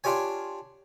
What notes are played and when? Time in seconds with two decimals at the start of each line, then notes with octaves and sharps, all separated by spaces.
0.04 D4 F4 G4 C#5 G#5